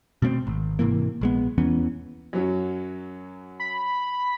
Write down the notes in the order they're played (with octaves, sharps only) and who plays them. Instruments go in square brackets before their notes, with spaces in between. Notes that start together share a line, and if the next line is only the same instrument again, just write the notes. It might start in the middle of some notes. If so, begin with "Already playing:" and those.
[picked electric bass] B2 A3 B3 C4
G#1
G#2 C3 E3 A#3
A#1 G#3 B3
E2 E3 B3 C#4
[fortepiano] F#2 F#3
[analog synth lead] B5